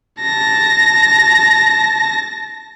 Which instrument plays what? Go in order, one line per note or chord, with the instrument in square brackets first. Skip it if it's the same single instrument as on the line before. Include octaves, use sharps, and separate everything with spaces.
[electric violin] A5 A#6